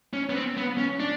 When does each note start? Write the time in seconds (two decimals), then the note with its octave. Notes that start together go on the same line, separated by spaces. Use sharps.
0.13 C#4
0.30 B3
0.35 C4
0.57 B3
0.78 C#4
1.00 D4